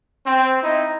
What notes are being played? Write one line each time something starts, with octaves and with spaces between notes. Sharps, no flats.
C4
D#4 E4